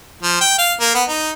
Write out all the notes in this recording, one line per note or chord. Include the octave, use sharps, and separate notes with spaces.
F3
G5
F5
A#3
B3
D#4